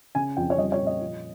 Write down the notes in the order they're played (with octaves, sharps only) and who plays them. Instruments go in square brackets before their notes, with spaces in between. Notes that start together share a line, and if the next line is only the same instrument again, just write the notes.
[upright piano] C#3 G#5
F2 G5
C#5
G3 D#5
C#5
A#2
D#5
F3